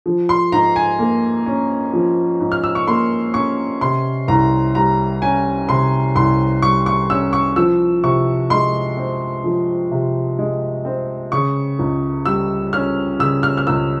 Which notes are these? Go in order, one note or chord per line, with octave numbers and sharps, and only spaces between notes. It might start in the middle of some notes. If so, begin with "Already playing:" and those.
F3
C6
G#2 A#5
G#5
A#3
C#4
F3
G#2
F6
E6
C#6
A#3 C6
C#4 C#6
C3 C6
C2 A#5
G3 A#5
C#4 G#5
C3 C6
C2 C6
G3 C#6
C#6
C#4 E6
C#6
F3 E6
C3 C#6
G#3 C6
C4
F3
C3
G#3
C4
C#3 C#6
C#2
G3 E6
C#4 F6
C#3 E6
F6
F6
C#2 E6